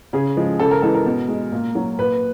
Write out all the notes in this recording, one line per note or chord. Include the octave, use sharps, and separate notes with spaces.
C#3 G#4
F3 G#3
C#3 A4
A#4
E3 G#3 A4
A#4
B2
G#3
A#2
F#3
A#2 B4